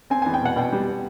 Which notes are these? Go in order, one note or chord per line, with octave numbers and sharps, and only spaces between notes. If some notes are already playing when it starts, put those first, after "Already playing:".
C4 G#5
E2 G#5
G5
B2 F#5
B2 G5
G3